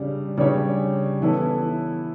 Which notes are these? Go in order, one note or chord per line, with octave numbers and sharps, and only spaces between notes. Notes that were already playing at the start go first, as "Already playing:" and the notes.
Already playing: C#3 G3 D4 G4
C#3 G3 D4 G4 C#5
E3 B3 E4 A4 C#5